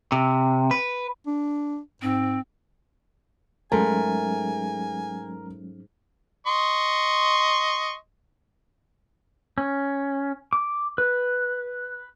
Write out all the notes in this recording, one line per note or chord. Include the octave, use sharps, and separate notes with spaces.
C3
B4
D4
G#2 C4
G#2 F#3 G#3 A3 C#4 A#4 G#5
D#5 C6 C#6
C#4
D6
B4